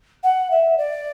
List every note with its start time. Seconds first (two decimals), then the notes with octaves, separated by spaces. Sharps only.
0.23 F#5
0.51 E5
0.78 D5